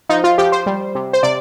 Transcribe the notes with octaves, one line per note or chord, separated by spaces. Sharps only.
F3 D#4
F4
F3 G4
C5
G3
C3
C5
C3 D5